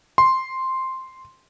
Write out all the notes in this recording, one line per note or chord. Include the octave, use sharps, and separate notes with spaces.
C6